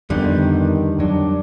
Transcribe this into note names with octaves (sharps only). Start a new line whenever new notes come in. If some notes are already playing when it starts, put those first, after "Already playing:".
F2 D3 D#3 G3 A#3 B3
F2 F#3 G3 D4